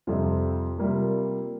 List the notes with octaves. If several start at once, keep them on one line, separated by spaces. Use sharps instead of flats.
F2 C3 G3 C4 F4
C3 G3 A#3 F4